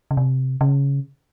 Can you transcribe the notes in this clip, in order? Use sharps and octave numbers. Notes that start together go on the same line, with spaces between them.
C#3
C3
C#3